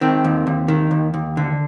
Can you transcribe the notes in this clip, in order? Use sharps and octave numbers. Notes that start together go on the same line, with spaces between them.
D#3 C4
D#2
D#2
D#3
D#2
D#2
D3